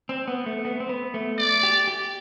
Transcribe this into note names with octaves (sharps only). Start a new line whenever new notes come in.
C4
B3
A3
B3
C4
B3
A3
D5
G4
G4